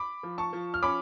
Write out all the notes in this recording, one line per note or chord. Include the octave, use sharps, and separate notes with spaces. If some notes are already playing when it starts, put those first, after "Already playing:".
Already playing: B5 D6
F3
A5 C#6
F3
F6
C#4 B5 D6